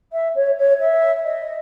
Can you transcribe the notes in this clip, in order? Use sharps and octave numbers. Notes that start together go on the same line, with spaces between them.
E5
C#5
C#5
E5
D#5